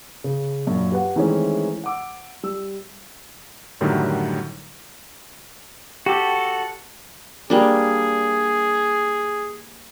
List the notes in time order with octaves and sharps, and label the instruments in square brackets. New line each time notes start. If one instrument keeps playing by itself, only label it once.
[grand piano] C#3
F#2 A#2 D4
G4 B4 F#5
D#3 E3 G#3 A3 C4 C#4
F#5 D6 E6
G3 E6
[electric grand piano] F#2 A2 D3 D#3 F#3 G3
[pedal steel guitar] F#4 A4 [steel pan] G4
[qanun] G3 A#3 D4 [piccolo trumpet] G#4